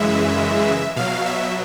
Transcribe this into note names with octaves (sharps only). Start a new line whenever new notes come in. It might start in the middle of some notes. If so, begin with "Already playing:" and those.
Already playing: F#2 C#3 E3 G#3 E5
B2 F#3 F5
E5